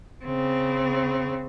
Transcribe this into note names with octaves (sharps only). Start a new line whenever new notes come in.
C#3 C4